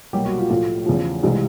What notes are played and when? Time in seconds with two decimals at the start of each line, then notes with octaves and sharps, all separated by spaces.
0.13 C2 B2 F#3 G3 A#3 G4
0.25 F#4
0.38 F4
0.49 A2 F3 A3 F4
0.86 E2 C#3 F3
1.23 C2 C3 E3 G#3